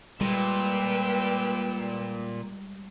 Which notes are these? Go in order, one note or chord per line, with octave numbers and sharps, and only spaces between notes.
A#2 G3 G#3 B4 G5 E6